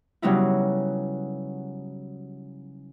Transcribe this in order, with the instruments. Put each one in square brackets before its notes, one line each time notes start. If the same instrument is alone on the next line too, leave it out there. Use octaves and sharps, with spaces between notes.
[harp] C#3 F#3 G3 B3 D#4 E4